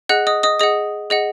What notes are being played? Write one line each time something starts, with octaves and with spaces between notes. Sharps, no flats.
G#4 D#5 F#5 F#6
D#5 D#6
D#5 D#6
G#4 D#5 F#5 D#6
G#4 D#5 F#5